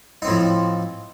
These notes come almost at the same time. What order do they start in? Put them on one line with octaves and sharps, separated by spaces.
D#4 C4 A2 F3